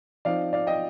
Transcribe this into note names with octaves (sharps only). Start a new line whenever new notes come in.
F3 C4 D#4 D5 F5
D5 F5
D#5 G5